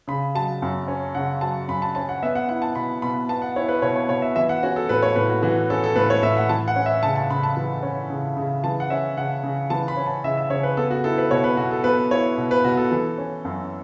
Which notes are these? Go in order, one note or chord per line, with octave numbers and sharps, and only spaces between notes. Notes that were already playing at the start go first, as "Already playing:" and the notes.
C#3 B5
F#3 A5
F#2
C#4
C#3 F#5
F#3 A5
F#2 B5
A5
C#4 A5
F#5
B3 E5
F#5
E4 F#5
A5
B2 B5
B2 B5
B3 A5
F#5
E4 C#5
B4
B2 C#5
C#5
B2 C#5
E5
E3 E5
F#5
C#4 F#4
A4
A2 B4
C#5
A2 B4
F#4
E3 F#4
C#4 A4
A4
A2 B4
C#5
A2 E5
F#5
E3 A5
F#5
C#4
E5
C#3 A5
A5
C#3 B5
A5
E3
C#4
C#3
C#3
E3 A5
F#5
C#4 E5
C#3 F#5
C#3
E3 A5
B5
C#4
A5
C#3 E5
E5
C#3 C#5
B4
B3 A4
F#4
E4 A4
B4
B2 C#5
B4
B2 F#4
A4
B3 B4
E4 C#5
B2
B4
B2 F#4
A4
E3
C#4
F#2